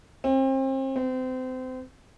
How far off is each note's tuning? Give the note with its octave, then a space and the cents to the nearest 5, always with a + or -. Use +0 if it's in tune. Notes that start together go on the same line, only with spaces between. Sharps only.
C4 +35
C4 -30